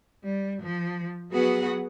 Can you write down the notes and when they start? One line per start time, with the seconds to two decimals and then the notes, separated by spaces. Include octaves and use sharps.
0.23 G3
0.61 F3
1.31 F#3 B3 F#4 G#4 B4 F#5